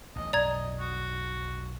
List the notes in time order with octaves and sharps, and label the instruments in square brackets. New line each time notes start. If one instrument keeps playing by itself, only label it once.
[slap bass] A1 D#2 [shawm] D#5
[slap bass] B1 F2 [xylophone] D5 A#5 G#6 [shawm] D#5
[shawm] F#4